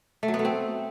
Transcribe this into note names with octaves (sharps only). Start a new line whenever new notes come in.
A3
F#3
B3
A3
C4